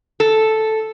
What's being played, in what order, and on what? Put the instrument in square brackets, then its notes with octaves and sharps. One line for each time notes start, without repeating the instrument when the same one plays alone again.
[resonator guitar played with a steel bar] A4